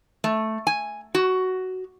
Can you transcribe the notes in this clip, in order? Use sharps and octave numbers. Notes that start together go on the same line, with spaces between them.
A3
G#5
F#4